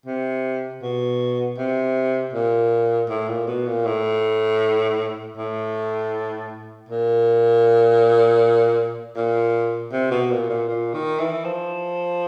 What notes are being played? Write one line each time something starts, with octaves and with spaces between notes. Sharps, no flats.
C3
B2
C3
A#2
A2
A#2
B2
A#2
A2
A2
A#2
A#2
C3
B2
A#2
A#2
A#2
D#3
E3
F3